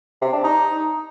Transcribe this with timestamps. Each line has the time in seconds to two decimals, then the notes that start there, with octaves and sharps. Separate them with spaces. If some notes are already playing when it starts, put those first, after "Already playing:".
0.21 C3
0.33 D4
0.44 D#4